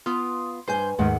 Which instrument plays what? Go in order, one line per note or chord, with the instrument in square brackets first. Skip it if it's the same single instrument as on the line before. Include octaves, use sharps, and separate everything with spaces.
[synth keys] B3 F4 [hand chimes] C6 D#6
[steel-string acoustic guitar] G2 G#5 [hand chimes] B4 [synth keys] C5 G6
[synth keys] D#2 G#2 D#3 [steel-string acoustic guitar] G#3 F#5